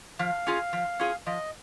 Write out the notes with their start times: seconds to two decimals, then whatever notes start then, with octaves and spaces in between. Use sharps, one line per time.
0.19 F3 F5
0.47 C#4 F4 G#4
0.73 F3
0.99 C#4 F4 G#4
1.26 F3 D#5